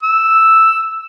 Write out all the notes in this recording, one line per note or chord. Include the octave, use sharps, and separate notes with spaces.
E6